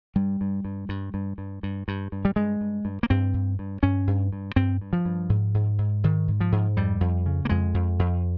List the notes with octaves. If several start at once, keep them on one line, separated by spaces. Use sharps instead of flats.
G2 G3
G2
G2
G2
G2
G2
G2
G2
G2
G3
G2 G#3
G2
G2
A#3
G2 C4
G2
G2
G2 C#4
G2
G2
G2 C4
G2
F3
G2
G#2
G#2
G#2
G#2 D#3
G#2
F3
G#2
F2 G3
F2
C#3
A#3
F2 G#3
F2
F2